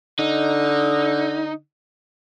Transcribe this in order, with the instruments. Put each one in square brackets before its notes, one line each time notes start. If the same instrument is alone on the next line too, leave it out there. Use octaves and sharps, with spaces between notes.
[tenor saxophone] D3 [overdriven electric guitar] D#4